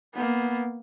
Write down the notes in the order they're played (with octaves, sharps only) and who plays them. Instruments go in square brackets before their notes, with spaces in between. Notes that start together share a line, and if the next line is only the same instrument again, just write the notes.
[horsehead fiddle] A#3 B3